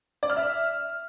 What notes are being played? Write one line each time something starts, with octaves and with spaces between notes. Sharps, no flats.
D5
F6
E5